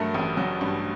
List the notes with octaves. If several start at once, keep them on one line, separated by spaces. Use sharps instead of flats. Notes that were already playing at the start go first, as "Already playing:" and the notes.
Already playing: G2 F#3 A3 A4 A#4
A1
F#3
G2